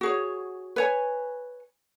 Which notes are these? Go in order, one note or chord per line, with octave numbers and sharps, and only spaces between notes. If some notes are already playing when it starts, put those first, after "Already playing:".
F#4 G#4 C#5
B4 C#5 G#5